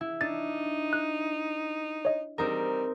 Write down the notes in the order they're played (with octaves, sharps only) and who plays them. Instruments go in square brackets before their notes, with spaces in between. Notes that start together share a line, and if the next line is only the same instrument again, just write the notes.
[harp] E4
[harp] D4 [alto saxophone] D#4 [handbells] A6
[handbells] F#6
C#5 D#5
[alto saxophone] G3 [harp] C4 D#4 A#4